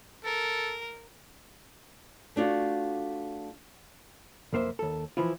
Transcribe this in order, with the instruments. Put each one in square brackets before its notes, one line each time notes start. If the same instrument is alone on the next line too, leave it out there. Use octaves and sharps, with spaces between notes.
[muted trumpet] A4 [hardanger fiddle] A#4
[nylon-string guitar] A3 D4 F4 F#4
[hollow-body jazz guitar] B1 F2 A#3 C5 E5
D#2 A4
E3 F3 E4 F4